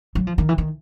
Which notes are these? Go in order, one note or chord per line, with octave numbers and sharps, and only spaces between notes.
F#3
F3
D#3
E3
D#3